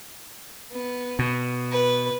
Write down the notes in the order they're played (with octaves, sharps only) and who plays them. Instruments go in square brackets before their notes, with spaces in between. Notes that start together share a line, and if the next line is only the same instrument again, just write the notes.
[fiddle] B3
[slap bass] B2
[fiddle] B4